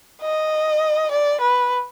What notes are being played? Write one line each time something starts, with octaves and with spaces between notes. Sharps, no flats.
D#5
D5
B4